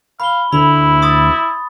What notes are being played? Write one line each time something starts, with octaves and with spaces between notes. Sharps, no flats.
F5 B5 G7
D2 E4 B5
C6 D#6 A6